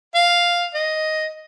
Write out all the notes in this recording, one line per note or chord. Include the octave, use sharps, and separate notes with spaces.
F5
D#5